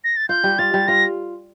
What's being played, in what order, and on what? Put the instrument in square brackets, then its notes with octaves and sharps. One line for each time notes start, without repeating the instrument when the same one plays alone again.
[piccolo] A#6
A6
[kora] F4 [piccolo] G6
[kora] G3
[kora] F4 [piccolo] A6
[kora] G3
[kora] F4 [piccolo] A#6